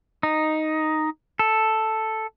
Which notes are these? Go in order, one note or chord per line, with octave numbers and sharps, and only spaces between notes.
D#4
A4